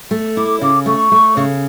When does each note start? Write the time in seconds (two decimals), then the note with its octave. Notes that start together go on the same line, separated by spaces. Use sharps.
0.11 A3
0.37 E4 D6
0.61 C#3 D6
0.86 A3 C#6
1.11 A3
1.37 C#3